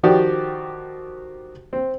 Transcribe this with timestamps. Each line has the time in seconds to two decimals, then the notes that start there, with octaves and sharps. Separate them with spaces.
0.03 D#3 F3 F#4 G4 D5
1.73 C4